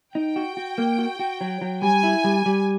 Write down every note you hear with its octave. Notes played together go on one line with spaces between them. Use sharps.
D#4 G5
F#4
F#4
A#3
F#4
F#4
F#3
F#3
G3 G#5
E4
G3
G3